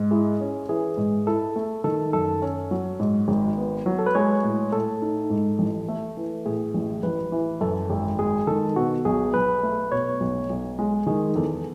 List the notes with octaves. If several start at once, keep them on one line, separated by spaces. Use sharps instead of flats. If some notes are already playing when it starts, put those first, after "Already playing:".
Already playing: G#2
E4 G#4
C#4
E3 G#4
G#2
E4 A4
A3
D#3 A4
F#2 A4
C#4
F#3
G#2
G#1
B3
F#3
A4
B4
G#3 C#5
A2
A2 A4
D#4
G#2
A1
A3
E3
A2 G#4
A1
A1 B4
E3
F#2 A4
G#1
G#3 G#4
D#3 A4
B2 F#4
B1 G#4
B1 B4
A3
B2 C#5
B1
B1
G#3
D#3 G#4
E2 A4